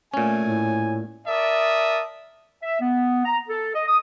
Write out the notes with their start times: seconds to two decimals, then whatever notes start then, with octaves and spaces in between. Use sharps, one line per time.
0.14 A#2 A3 C#4 G#5
0.46 A2
1.27 A#4 D5 E5 A5 D#6
2.63 E5
2.81 B3
3.25 A#5
3.49 A4
3.75 D#5
3.88 D#6